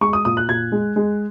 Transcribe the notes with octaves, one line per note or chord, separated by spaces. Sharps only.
G#3 C#6
D#6
A#2 D#6
F#6
A#2 G#6
G#3
G#3